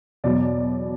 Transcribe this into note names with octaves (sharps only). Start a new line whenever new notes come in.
E2 B2 F#3 D5